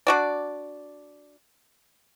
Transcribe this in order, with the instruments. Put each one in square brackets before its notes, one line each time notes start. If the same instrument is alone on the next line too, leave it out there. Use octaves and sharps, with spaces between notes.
[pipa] D4 F#4 D5